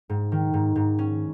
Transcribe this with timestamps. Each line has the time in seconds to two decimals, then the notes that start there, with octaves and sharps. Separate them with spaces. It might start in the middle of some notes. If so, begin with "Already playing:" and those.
0.09 G#2
0.32 D#3
0.54 G#2
0.76 G#2
0.99 C#4